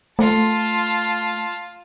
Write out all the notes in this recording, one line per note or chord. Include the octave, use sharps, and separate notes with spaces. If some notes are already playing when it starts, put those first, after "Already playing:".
A3 F4 A5